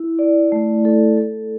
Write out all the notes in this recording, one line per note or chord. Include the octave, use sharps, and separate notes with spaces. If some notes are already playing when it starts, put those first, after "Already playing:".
Already playing: E4
D5
A3
A4
A4